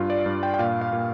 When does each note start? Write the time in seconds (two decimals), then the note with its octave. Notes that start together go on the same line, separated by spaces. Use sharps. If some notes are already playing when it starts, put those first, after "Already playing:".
Already playing: G2 F4
0.10 D5
0.26 G2
0.43 G5
0.54 G5
0.59 A#2 F5
0.81 F5
0.93 A#2